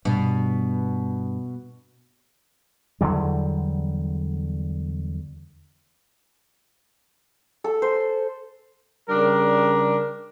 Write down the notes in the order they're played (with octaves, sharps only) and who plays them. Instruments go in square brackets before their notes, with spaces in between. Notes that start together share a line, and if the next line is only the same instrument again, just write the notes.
[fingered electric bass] G2 [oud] B2
[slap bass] E2 D3 F#3 G3
[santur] A4
C5
[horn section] C#3 G3 D4 A#4